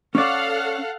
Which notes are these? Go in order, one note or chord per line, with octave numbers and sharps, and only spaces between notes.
C#4 A4 D5 F5 F#5